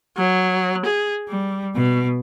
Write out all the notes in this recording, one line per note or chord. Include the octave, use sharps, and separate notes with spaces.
F#3
G#4
G3
B2